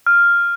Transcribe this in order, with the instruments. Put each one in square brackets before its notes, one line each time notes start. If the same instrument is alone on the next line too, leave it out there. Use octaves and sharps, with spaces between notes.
[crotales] F6